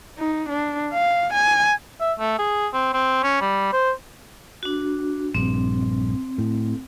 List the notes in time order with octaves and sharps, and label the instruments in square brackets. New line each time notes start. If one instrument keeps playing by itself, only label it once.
[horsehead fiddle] D#4
D4
F5
G#5
[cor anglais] E5
A3
G#4
C4
C4
C#4
G3
C5
[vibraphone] D4 F#4
[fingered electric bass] A#1 G2 [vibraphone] C4
[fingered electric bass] A2